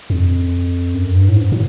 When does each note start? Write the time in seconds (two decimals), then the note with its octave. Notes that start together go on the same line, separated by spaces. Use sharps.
0.10 F2
0.94 F#2
1.15 G2
1.29 A2
1.36 G#2
1.52 A2